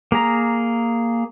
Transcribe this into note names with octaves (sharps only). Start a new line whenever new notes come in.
A#3 G#4 A#5